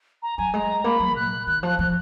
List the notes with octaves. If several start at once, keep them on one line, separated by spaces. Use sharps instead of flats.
A#5
F#3 G#5
G#3 A#5
A#3 B5
F#3
A#2 F#6
D#3 F#6
F3 F#6
F3 F#6